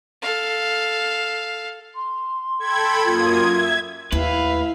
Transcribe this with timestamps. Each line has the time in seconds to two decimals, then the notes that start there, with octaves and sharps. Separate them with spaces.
0.22 A4 F5
1.95 C6
2.59 A4 G5 B5 G#6
3.05 F#2 A#3 F4 D#6
3.50 E5
4.12 D#2 A2 B4 E5 F5